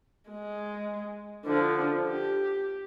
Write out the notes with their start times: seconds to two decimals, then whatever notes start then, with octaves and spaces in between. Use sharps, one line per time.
0.30 G#3
1.46 D3 F3
2.07 G4